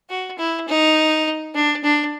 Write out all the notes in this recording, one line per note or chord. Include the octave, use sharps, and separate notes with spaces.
F#4
E4
D#4
D4
D4